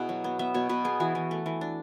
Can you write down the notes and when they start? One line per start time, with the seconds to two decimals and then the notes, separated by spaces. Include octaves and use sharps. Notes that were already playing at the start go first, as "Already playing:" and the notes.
Already playing: B2 E4 G#4 F#5
0.09 F#3
0.24 B3
0.39 B3 E5
0.54 B2 C#5
0.69 B2 B4
0.85 B3 G#4
1.00 E3 F#4
1.15 E3
1.31 A3
1.46 E3
1.61 D4